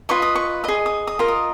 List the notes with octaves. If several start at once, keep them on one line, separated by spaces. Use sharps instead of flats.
F4 B4 D#5 C#6
D#6
C#6
G#4 D#5 D#6
D#6
D#6
F4 A#4 D#5
D#6